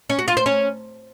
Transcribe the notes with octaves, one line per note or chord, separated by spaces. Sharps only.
C#4
F#4
F4
C5
C#4